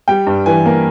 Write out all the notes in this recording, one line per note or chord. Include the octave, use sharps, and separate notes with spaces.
G3 G5
G2
E3 G#5
A#3